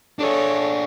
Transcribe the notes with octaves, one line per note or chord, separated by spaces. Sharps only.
D4 G#4 A4 C#5